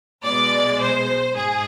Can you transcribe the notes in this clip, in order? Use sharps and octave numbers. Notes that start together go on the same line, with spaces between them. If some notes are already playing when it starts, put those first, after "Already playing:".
B1 B2 G#3 D5
C5
G#2 G#4